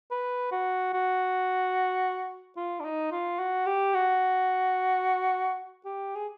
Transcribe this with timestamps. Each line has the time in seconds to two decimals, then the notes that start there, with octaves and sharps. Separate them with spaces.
0.11 B4
0.52 F#4
0.94 F#4
2.57 F4
2.80 D4
2.85 D#4
3.12 F4
3.39 F#4
3.66 G4
3.94 F#4
5.85 G4
6.16 G#4